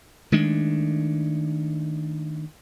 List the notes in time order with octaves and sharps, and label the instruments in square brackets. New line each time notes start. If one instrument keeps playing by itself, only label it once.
[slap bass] D#3 G#3 A3 D4